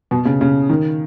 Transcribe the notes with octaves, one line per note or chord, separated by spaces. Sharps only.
B2
C#3
C#3
D#3